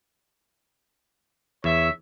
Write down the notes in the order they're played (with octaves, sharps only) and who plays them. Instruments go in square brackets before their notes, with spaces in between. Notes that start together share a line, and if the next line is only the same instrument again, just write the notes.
[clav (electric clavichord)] E2 [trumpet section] C#5 E5